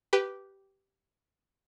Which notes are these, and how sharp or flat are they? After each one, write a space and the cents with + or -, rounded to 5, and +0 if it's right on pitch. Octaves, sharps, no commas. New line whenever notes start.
G4 -10 B4 +0